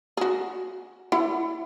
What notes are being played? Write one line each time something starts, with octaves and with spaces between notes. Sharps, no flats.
F#4 G#4
E4 F#5